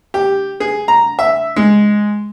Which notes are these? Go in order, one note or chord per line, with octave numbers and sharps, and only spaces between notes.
G4
G#4
A#5
E5
G#3